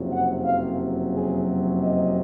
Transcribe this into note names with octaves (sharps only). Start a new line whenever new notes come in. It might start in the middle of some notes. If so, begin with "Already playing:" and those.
Already playing: F#1 F2 C3 F#3
F#5
F5
G#4
D#5